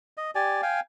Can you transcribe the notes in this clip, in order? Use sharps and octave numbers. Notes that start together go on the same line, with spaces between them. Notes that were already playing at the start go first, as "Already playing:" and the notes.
D#5
G4 D5 G#5
F5 G5 G#5